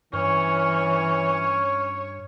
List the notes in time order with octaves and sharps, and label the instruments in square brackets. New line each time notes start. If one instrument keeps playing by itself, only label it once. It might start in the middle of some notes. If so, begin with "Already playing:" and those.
[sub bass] G2 [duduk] E3 [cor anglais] C#4 [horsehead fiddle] C#5